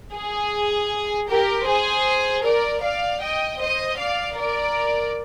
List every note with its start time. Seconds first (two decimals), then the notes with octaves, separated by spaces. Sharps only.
0.15 G#4
1.29 G4 A#4
1.67 G#4 C5
2.44 A#4 D5
2.82 D5 F5
3.21 D#5 G5
3.60 C5 D#5
3.97 D5 F5
4.36 A#4 D5